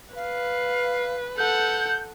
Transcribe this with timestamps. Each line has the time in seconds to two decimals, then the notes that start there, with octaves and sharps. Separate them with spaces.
0.15 B4 F5
1.37 A4 F#5 G6